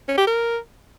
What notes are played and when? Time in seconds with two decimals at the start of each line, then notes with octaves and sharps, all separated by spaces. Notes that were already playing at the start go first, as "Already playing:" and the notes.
0.08 C#4
0.18 G4
0.27 A#4